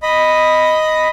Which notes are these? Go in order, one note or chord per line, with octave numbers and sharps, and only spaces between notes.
D#5 B5